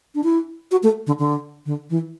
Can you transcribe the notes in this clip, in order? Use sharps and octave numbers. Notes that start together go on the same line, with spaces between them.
D4
E4
F#4
A3
D3
D3
D3
E3